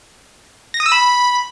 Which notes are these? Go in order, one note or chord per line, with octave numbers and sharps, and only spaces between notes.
A#6
D#6
E6
B5